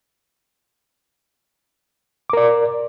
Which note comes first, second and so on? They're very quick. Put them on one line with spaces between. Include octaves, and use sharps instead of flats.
D6 A#4 D5